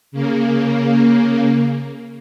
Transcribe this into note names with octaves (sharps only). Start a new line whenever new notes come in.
C#3 A#3